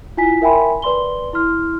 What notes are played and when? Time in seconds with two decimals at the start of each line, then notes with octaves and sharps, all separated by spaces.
0.17 E4 F4 G#5 B6
0.42 A#4 E5 G5 G#5 B5 C6
0.82 B4 D5 C6 G7
1.33 E4 C6 F6